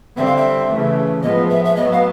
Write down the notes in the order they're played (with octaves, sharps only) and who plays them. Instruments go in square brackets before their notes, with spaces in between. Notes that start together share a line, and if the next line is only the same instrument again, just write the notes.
[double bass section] D3 G3 C4 [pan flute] E5
[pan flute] F5
E5
[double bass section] C#3 E3 A3
[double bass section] A2 F3 G#3 B3 [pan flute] D#5
[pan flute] E5
E5
[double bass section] A2 F#3 B3 [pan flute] D#5
[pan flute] F5